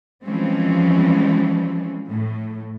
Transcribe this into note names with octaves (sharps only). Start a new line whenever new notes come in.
E3 F3 G3 G#3 C4 C#4
A2